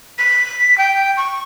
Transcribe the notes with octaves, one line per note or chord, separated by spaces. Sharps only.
B6
G5
C#6